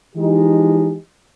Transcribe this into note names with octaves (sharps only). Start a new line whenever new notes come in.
E3 F3 G#3 D#4 G4